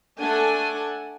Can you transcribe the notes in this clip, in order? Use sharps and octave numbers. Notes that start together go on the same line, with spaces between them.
A3 D4 A4 F#5 G#5